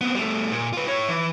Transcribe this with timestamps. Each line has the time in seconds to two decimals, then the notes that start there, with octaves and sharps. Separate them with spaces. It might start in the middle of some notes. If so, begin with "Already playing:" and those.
0.01 B3 C4
0.15 G3 A3
0.52 A#2
0.73 F4 B4
0.87 E4 C#5
1.08 E3